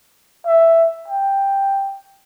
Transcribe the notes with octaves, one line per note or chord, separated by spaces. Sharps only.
E5
G5